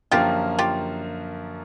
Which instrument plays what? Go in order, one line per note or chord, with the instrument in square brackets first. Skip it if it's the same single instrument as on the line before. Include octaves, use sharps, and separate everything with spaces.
[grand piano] F#2 D3 F3 A#3 [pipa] F4 G4
[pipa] F4 G4